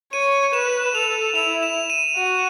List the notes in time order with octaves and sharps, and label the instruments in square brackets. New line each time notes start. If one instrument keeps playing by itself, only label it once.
[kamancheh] C#5 [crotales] D#7
[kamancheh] B4 [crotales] E7
[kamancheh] A4 [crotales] F7
[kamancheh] E4 [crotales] F7
[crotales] E7
D#7
[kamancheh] F#4 [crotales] D#7